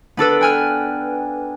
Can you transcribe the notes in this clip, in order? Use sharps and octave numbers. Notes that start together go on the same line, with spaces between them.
B3 D4 A4 B4
G5 G#5 F6